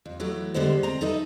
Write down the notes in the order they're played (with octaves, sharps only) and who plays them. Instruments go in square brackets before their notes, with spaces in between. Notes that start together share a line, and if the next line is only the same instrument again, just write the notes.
[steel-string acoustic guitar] F2
E3 F#3 A3 B3
D3 G3 G#3 B3 C5
C4 A#5
D#4 A4 B4 D#5 E5